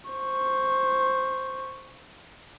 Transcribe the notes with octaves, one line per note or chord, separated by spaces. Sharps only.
C5 C#6